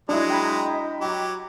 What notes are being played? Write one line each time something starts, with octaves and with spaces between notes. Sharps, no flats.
F#3 G#3 D4 E4 D#5
G5 A#5 B5
F#3 G4